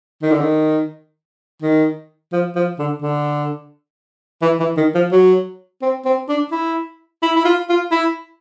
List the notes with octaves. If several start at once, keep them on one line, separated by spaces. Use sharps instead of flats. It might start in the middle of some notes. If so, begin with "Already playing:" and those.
D#3
D3
D#3
D#3
F3
F3
D3
D3
E3
E3
D#3
F3
F#3
C4
C4
D4
E4
E4
E4
F4
F4
E4